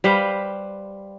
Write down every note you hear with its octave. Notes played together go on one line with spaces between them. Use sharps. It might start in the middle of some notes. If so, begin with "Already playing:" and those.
G3 B4 C5 F5